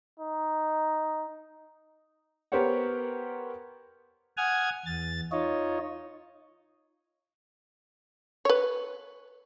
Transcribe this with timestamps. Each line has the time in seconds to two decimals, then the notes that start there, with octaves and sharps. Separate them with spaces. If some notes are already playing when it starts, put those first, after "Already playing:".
0.20 D#4
2.52 B3 G4 A#4 C5 C#5 F#5
4.37 F#5 G#5 D#6 F6 G#6
4.86 E2 A6
5.32 D#4 F4 C#5 D#5
8.45 B4 C#5